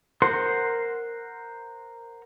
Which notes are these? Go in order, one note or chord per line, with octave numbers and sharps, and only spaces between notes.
A#4 C5 F#5 C6